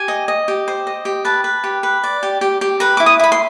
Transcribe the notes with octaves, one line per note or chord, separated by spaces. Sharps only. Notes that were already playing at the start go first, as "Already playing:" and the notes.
Already playing: G4 G#5
D#5
D#5
G4
C5
D#5
G4
B4 A5
B4
G4
B4
D5
G4
G4
G4
B4 A#5
E4 D6
D#6
E4 B5
C6